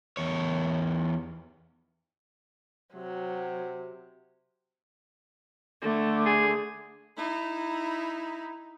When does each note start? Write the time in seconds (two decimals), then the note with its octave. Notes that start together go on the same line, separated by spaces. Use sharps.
0.17 E2 C#5
2.95 C3 F#3
5.82 D3 A3
6.26 G#4
7.17 D#4 E4